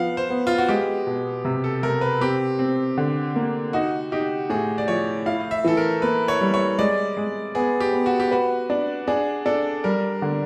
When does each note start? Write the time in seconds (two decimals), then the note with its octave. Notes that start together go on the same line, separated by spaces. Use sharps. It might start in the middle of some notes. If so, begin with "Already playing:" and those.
Already playing: F3 B3 F5 F#5
0.17 C5
0.30 B3
0.47 F4
0.58 F#4
0.69 G#3 G4
1.07 B2
1.45 C3
1.64 A4
1.83 C3 A#4
2.01 B4
2.21 C4 G4
2.59 C4
2.98 D3
3.36 A#3
3.73 D#4 F#4
4.12 D#4 G4
4.50 A2 G#4
4.78 D5
4.88 F3 C#5
5.26 E4 F5
5.51 E5
5.64 E3 A4
5.77 A#4
6.02 A#3 B4
6.28 C#5
6.41 G3
6.54 C#5
6.78 G#3 D5
7.17 G#3
7.55 B3 G#4
7.80 G4
7.93 B3
8.06 F#4
8.20 G4
8.31 F#4 B4
8.70 D4
9.07 D4 G#4
9.46 D4 A4
9.84 G3 A#4
10.22 D3